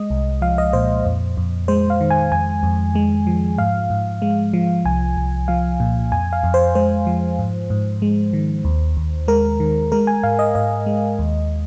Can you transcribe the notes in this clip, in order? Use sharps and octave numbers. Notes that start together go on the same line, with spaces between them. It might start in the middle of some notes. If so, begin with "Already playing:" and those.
Already playing: G#3 D#5
C2
F3 F5
D#5
A#2 C5
F2
F2
G#3 C5
F5
D#3
G#5
F2 G#5
F2
G#3
F3
G#2 F5
G#2
G#3
F3
C2 G#5
C2
F3 F5
A#2
F2 G#5
F5
F2
C5
G#3 C5
F3
G#2
G#2
G#3
D#3
D#2
D#2
G#3 A#4
D#3
G#3 A#4
G#5
G#2 F5
D#5
G#2 D#5
G#3
D#2